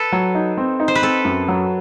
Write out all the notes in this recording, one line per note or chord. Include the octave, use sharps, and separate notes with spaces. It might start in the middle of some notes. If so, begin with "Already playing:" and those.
Already playing: A4 B4
F#3
D#4
C4
D#4
C5
B4
C4 A4
F#2
F#3